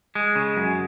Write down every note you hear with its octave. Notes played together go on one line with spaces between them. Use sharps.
G#3
C#3
F#2